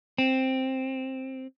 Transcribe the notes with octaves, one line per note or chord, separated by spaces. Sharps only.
C4